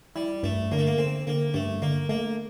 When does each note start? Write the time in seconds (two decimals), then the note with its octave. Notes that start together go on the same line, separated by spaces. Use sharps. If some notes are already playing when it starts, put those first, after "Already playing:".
0.16 G3 E4
0.43 G2 A3
0.72 D3 A#3
0.79 A3
0.87 A#3
0.98 D3 C4
1.27 D3 A#3
1.54 G2 A3
1.82 D3 A#3
2.09 A3 A#3